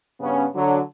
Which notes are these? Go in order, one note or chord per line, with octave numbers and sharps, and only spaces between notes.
G2 C#3 B3 C#4
D3 F#3